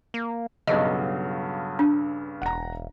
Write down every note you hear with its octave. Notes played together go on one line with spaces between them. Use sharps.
A#3
B1 G2 C#3 F#3 D#5
D4
E1 F#5 A#5